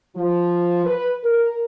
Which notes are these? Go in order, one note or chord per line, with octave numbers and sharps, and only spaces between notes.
F3
B4
A#4